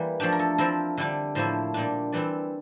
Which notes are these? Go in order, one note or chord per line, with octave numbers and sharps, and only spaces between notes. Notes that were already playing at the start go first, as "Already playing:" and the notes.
Already playing: E3 G3 A#3
F3 A3 D4 G4
A#4
A4
F3 C4 E4 A#4
D3 G3 D4
A2 F3 A#3 E4 C5
A#2 G3 D4
E3 G3 C4 E4 D5